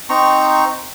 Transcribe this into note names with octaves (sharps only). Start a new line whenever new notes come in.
C4 D#4 A#5 C#6